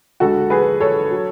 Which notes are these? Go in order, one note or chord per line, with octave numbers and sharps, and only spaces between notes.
D2 D3 G#3 F#4 A4
G#4 B4
A4 C#5
F#3